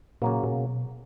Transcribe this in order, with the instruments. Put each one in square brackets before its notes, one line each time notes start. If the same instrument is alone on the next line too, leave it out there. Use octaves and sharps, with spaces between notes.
[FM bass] A#2 [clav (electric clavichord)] C#3 F#3 A#3
[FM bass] A#2
B2